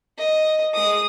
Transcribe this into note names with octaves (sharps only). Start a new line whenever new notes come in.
D#5
G#3 D#6